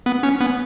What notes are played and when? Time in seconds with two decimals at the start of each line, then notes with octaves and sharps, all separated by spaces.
0.06 B3
0.23 C#4
0.41 B3